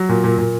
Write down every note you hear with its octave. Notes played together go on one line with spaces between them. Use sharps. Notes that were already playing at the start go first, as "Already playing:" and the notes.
Already playing: F#3
A#2
A#2
A#2